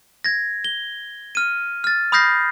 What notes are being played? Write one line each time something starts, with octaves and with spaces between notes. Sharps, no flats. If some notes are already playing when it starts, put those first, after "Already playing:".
G#6 A#6
G7
F6 D#7
F6 A6
B5 D#6 F6 G6 A#6 C7